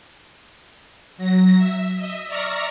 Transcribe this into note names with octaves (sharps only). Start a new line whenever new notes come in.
F#3 A#6
E5
D#5 E5
D5 E5 A#5 C#6 F6 A#6